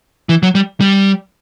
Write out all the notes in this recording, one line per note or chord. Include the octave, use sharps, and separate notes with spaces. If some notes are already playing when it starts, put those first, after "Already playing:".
E3
F#3
G3
G3